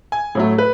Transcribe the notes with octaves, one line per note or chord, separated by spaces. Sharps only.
G#5
A2 F#3 A3
B4